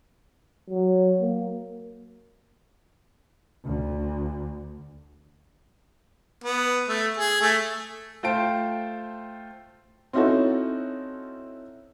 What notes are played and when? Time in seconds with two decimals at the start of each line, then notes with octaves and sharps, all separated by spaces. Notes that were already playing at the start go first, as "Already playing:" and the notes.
0.70 F#3
1.21 A#3
3.65 D2
6.44 B3
6.88 A3
7.17 G#4
7.41 A3
8.23 A3 F4 C5 G5 A5 D7
10.13 C4 C#4 D#4 E4 F#4 A4